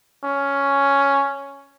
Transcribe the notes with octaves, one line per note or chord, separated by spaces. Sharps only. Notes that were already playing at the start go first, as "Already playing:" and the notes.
C#4